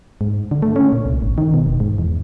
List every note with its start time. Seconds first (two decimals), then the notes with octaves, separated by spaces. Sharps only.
0.21 G#2
0.51 D3
0.62 A3
0.76 C#4
0.93 A#2
1.05 C2
1.22 G#1
1.38 D#3
1.54 B2
1.66 E1
1.80 G#2
1.98 E2